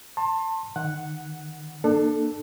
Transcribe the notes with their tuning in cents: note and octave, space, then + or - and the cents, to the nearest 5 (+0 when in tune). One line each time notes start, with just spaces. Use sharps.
A5 +20 C6 +30
D#3 -15 F#5 +0
A#3 +5 D4 +35 A4 +0